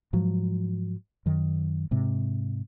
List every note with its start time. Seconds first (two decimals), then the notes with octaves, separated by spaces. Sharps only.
0.13 G#2 F3 F#3
1.26 F#2 D#3
1.91 G#2 C3